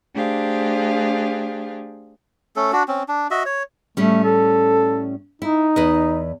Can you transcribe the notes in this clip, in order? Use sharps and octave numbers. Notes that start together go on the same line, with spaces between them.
A3 D4 G4 G#4 C5 F5
A3 C#4 A4
D4 F#4
C4 C#4
D4
F#4 D#5 E5
C#5
A2 G3 A3 C#4
A4
D#4 E4
E2 B4 D#5